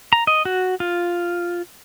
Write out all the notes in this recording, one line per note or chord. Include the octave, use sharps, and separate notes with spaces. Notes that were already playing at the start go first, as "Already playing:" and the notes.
A#5
D#5
F#4
F4